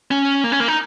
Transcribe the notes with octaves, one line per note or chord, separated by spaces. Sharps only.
C#4
A#3
C#4
A#3
D#4